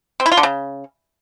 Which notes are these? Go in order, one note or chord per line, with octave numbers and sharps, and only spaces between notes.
C4
E4
F4
D3
C#3